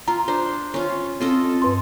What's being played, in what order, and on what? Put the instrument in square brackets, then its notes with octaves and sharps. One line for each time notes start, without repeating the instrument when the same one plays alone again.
[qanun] F4 [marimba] A#5
[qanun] D4 C5
C#4 F4
[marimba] C4 [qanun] F4 A4 D#5
[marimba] G2 B4 C6